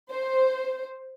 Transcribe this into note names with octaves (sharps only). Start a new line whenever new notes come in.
C5